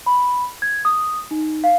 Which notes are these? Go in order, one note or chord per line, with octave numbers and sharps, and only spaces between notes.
B5
G#6
D#6
D#4
F5